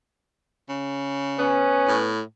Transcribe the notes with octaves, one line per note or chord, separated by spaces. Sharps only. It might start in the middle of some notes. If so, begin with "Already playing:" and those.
C#3
B3 C#4
A2